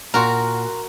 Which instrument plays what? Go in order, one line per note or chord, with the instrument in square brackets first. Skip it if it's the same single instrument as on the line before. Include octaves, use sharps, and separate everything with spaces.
[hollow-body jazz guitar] A#2 [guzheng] F#4 A#4 [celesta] A#5 C6